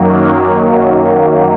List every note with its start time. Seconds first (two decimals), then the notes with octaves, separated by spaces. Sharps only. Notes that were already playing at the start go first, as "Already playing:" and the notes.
Already playing: F#2 D#3 F#3 A#3